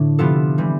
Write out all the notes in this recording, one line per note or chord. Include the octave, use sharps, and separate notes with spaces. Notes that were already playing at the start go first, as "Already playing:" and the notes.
Already playing: A2 D3 D4
C3 F3 B3 F4 A4
C3 E3 G3